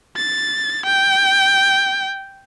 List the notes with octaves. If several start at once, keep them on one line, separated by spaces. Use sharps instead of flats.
A6
G5